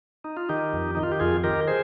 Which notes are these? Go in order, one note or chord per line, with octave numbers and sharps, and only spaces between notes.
D#4
F4
D#3 D#4 G4
F2
D#3 D#4
F4
G4
F2 F4 G#4
D#3 G4 A#4
G#4 C5